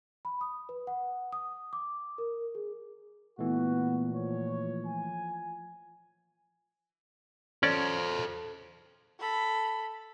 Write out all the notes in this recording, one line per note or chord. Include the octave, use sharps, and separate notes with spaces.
B5
D#6
B4
F#5
D#6
D6
A#4
G#4
A#2 E3 A3 B3 F#4
F3 C#5
G#5
C#4 A4 C5 D5
A4 B5